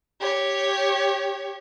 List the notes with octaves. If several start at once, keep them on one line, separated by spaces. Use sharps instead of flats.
G4 C#5